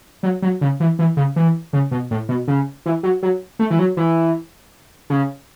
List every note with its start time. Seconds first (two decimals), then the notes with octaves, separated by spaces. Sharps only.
0.23 F#3
0.42 F#3
0.61 C#3
0.80 E3
0.99 E3
1.17 C#3
1.36 E3
1.73 C#3
1.91 B2
2.11 A2
2.29 B2
2.48 C#3
2.86 E3
3.03 F#3
3.23 F#3
3.59 A3
3.70 E3
3.79 F#3
3.97 E3
5.10 C#3